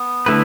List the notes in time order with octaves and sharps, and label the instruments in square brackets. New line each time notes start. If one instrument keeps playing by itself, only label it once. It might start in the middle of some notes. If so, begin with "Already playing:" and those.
Already playing: [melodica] B3
[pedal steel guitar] D3 A3 E4 B4